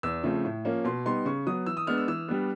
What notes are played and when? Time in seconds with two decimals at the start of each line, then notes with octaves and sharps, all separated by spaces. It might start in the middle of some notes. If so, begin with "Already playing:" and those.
0.03 E2 E6
0.23 C#3 F3 A3 C4
0.45 A2
0.65 F3 A#3 C#4
0.84 B2 C6
1.05 G3 B3 D#4 C6
1.25 C#3 C#6
1.47 F#3 B3 D#6
1.66 E3 E6
1.77 D#6
1.87 G#3 B3 D4 F6
1.98 E6
2.08 E3 E6
2.28 G3 B3 D4